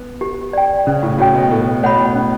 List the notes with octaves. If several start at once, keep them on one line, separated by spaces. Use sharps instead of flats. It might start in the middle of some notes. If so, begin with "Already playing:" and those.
Already playing: B3
G4
D5 G5
C#3 C#4
A2
A2 F#4 C#5 G5
B2
A2 A4
B2 C#5 F#5 B5
C#4